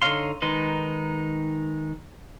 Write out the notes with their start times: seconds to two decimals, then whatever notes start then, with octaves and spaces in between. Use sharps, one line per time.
0.02 D3 D#4 C#5 F5 C6
0.42 D#3 G#3 D#4 B4 C6